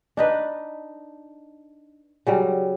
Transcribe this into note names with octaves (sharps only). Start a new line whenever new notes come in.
D4 D#4 B4
C#3 F#3 G3